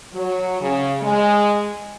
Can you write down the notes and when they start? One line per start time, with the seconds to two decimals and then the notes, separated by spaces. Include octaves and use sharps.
0.14 F#3
0.61 C#3
1.02 G#3